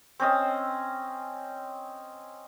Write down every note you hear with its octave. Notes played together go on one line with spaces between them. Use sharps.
C4 C#4 D#5 E6